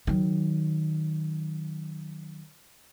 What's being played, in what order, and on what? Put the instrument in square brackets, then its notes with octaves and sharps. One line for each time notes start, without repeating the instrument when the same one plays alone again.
[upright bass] D#3 F#3